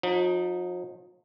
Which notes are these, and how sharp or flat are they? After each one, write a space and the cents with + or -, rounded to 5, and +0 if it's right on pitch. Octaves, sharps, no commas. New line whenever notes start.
F3 +45 D#4 +5